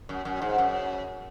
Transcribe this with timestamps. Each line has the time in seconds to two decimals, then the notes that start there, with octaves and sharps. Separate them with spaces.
0.09 F#2
0.25 F#2
0.42 G#2
0.58 F#2